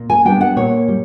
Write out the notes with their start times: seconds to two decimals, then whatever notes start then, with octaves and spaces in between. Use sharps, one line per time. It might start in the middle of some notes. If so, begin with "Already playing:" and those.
Already playing: A#2
0.10 G#5
0.25 G3 B3 D4 G5
0.41 F#5
0.56 A#2 C#5
0.88 G3